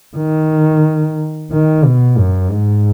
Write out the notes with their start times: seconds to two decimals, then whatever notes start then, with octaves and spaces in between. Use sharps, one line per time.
0.17 D#3
1.52 D#3
1.85 B2
2.18 F#2
2.51 G#2